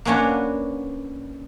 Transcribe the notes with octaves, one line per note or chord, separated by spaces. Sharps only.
A#3 B3 C#4 D4 F#4